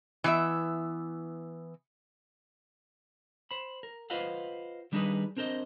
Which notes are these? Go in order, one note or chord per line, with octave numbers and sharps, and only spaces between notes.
E3 B3 E5
C5 B5
A#4
F4 B4 C5 D#5 F5 F#5
D#3 G3 D4 D#4 G#4 B4
C4 D4 A#4 C5 D#5